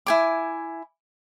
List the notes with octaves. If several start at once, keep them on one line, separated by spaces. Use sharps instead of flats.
E4 G#5 D6